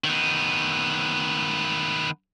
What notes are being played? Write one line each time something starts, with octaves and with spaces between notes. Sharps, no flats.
D#3 B3